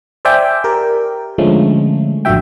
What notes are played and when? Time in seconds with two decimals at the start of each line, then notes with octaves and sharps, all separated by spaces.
0.25 C5 D5 E5 G5 G#5
0.64 G4 A#4
1.38 D3 F3 G#3 A3 C#4
2.25 A1 F2 D3 F#4 E5 G5